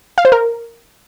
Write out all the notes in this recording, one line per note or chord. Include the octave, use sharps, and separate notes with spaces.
F5
C5
A#4